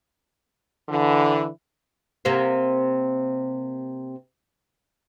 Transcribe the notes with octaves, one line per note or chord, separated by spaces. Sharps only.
D3 E3
C3 A#3 C4